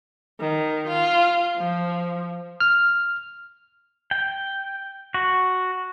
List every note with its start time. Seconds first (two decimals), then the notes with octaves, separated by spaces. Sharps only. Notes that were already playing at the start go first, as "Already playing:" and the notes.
0.40 D#3
0.88 F4
1.57 F3
2.60 F6
4.11 G5
5.14 F#4